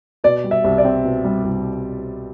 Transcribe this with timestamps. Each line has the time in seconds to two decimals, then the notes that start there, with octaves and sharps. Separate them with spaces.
0.24 B2 D5
0.44 G3
0.51 E5
0.64 C2
0.78 D5
0.85 C4
1.04 B2
1.24 G3
1.44 C2